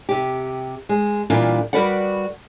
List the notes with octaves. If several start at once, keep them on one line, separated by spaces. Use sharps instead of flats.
C3 G4
G#3
A#2 E3 G3 D4 F4 A#4
G3 F#4 A#4 B4 D5 F#5